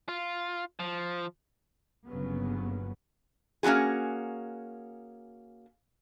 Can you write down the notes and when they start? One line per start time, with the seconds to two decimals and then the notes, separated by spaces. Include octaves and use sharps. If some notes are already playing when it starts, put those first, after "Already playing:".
0.08 F4
0.80 F3
2.08 G1 C#3 F#3 A#3 B3
3.63 A#3 C#4 D#4 F#4 G#4